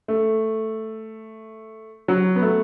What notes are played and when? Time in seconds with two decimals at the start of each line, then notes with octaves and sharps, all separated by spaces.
0.08 A3
2.08 F#3
2.36 B3
2.42 A3